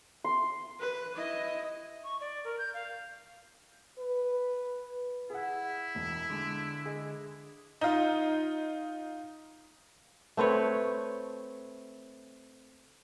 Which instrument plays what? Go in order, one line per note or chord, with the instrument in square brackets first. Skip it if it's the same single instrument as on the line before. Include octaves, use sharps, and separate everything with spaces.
[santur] C6
[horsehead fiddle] B4
E4 D#5
[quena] C#6
D5
A#4
G6
F5
[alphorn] B4
[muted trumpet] E4 [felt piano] G#4 F#5
[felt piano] E1
[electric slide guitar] D3 [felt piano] G#3
[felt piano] G#4 D#5
[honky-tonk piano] D#4 F4
[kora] A3 C4 B4 C#5